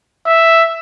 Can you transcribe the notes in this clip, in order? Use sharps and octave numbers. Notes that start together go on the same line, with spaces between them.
E5